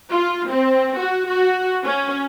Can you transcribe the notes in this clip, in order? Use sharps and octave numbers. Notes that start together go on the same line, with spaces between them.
F4
C4
F#4
F#4
C#4